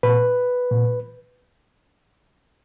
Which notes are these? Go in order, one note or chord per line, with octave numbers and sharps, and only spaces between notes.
A#2 B4
A#2